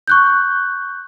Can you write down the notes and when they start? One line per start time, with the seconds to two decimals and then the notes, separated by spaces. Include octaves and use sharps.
0.08 C#6 F#6 G6